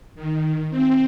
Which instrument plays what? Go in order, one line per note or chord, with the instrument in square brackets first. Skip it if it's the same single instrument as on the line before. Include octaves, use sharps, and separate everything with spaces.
[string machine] D#3
C4